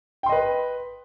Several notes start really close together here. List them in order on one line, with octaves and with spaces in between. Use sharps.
G5 C6 D#5 B4